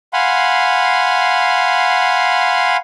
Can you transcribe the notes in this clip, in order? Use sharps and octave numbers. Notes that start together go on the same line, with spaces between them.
F5 F#5 G#5 B5 C6